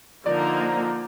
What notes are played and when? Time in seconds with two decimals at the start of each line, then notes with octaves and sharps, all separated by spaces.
0.26 D3 F3 A#3 D#4 A#4 D5